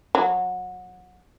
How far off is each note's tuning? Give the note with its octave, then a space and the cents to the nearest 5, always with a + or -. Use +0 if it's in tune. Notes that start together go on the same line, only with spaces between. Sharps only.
F#3 -25